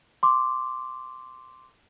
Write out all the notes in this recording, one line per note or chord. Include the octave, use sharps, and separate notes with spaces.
C6 D6